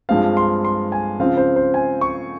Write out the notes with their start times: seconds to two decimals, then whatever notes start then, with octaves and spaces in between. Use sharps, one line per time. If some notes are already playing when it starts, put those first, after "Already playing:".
0.09 G2 F3 G#3 C4 F5
0.37 C6
0.65 C6
0.92 G#5
1.19 C#3 F3 C4 F5
1.37 C5
1.56 C5
1.74 G#5
2.01 C#6